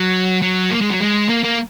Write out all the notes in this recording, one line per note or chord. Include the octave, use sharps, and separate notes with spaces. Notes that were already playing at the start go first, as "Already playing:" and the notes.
Already playing: F#3
F#3
A#3
G#3
F#3
G#3
A#3
A#3